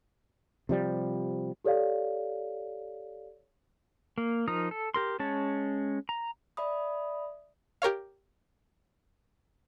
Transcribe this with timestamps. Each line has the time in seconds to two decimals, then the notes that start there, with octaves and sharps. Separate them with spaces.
0.69 C3 F3 G3
1.64 G4 A4 C#5 D5 F5
4.18 A#3
4.48 F3 D#4 A#4 D#6
4.71 A4
4.94 G4 A#4 C6
5.19 G#3 C#4 C#5 A5
6.09 A#5
6.57 D5 E5 B5 D#6
7.82 G4 A#4 C#5 F5